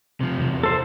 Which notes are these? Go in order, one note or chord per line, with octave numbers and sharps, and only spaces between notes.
C3 F3
E2 C3
A4 C5